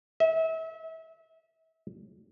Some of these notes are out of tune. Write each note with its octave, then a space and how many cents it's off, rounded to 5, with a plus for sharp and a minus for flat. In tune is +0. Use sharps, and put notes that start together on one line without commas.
E5 -30